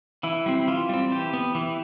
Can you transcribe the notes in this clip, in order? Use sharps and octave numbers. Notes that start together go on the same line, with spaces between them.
E3 E4
G3 C4
E3 F4
G3 C4
E3 G4
B3
E3